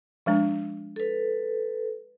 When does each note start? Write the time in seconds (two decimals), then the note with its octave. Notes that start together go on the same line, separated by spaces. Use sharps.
0.26 F3 G#3 D4
0.96 A4 B4